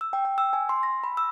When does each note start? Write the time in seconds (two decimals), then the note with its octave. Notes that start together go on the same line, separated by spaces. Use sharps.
0.01 E6
0.13 G5
0.25 G5
0.38 E6
0.53 G#5
0.69 C6
0.83 A#6
1.04 B5
1.17 E6